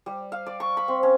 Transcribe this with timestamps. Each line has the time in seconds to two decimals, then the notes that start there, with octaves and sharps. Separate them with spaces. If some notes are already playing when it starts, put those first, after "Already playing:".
0.06 G3
0.32 F5
0.46 D5
0.60 C#6
0.77 B5
0.88 C4
1.03 C#4